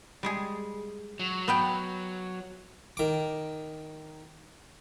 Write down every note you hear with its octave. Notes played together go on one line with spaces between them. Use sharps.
G3 G#3 G#4
F#3
B3 B4 G5
D#3 D6